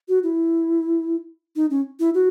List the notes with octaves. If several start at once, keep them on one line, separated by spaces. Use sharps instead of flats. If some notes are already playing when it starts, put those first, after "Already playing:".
F#4
E4
D#4
C#4
E4
F#4